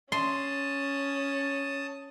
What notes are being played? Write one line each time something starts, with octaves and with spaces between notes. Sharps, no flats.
C#4 A5 C6 D#6